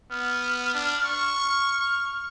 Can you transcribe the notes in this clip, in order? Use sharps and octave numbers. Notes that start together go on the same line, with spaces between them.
B3 F6
D4
C#6
F6